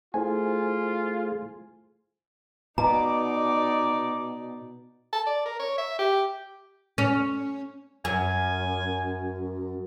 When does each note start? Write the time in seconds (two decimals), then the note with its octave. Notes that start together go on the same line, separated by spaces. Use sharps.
0.14 A3 E4 F4 G#4 C5 G#5
2.78 B2 D#4 D5 A#5 D6
5.13 A5
5.26 D5
5.45 A#4
5.59 C#5
5.78 E5
5.99 G4
6.98 C#4
8.05 F#2 G#5